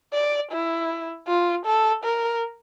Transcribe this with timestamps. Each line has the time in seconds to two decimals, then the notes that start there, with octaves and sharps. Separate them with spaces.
0.13 D5
0.51 E4
1.28 F4
1.65 A4
2.04 A#4